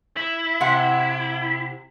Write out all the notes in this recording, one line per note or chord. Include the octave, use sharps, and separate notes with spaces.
E4
C3 F#5